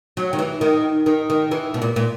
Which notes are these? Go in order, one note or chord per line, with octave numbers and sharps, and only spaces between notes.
F#3
D#3
E3
D#3
D#3
D#3
E3
B2
A#2
A#2